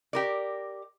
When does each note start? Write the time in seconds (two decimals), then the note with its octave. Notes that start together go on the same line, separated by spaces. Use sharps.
0.13 G4 A#4 D5